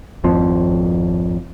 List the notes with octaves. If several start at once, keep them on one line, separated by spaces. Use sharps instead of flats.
G#1 F2 F3 C4